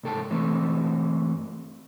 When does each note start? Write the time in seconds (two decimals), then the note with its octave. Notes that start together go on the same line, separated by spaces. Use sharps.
0.03 C2 G#2 A4 G5 A5
0.30 G2 E3 A3 C4